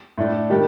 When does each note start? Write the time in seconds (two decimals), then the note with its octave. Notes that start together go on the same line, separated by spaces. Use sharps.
0.18 A2 A3 D4
0.50 D#3 G3 D4 G4